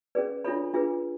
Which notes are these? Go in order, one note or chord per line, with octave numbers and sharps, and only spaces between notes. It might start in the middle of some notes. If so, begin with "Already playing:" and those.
C#4 G#4 B4 D5
D4 F4 A4 C#5 B5
D4 F4 G#4 B4